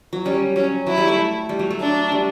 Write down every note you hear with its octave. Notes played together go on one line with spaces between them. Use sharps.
F#3
G3 C#4
F#3 C#4
F#3 E4
G3
A3
G3
F#3
A3
D4
G3